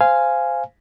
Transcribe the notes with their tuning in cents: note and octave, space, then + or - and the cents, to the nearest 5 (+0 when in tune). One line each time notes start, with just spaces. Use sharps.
C5 -15 F5 -10 G#5 +0